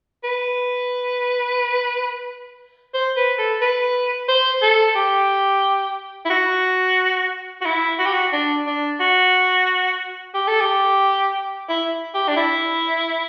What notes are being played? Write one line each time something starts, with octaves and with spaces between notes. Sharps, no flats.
B4
C5
B4
A4
B4
C5
A4
G4
E4
F#4
F#4
E4
F#4
G4
F#4
D4
D4
F#4
G4
A4
G4
E4
G4
D4
E4